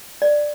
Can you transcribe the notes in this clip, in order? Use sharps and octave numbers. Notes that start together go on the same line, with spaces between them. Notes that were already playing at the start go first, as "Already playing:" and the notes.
D5